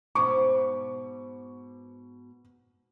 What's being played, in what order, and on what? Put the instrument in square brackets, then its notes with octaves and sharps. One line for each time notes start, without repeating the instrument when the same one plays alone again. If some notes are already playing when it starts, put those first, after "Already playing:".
[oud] G#2 B2 C5 [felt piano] C#6 D6